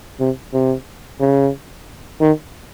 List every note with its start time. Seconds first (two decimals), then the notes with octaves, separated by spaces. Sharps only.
0.20 C3
0.54 C3
1.20 C#3
2.21 D#3